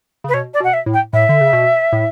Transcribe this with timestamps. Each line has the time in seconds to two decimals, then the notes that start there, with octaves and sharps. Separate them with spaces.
0.24 C#3 B4
0.33 B2 C#5
0.53 D5
0.60 B2
0.64 F#5
0.73 E5
0.86 A2
0.93 G5
1.13 A2 E5
1.29 D3
1.41 C#3
1.53 B2
1.93 A2